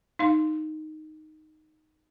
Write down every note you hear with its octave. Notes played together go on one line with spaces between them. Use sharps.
D#4 F5 C6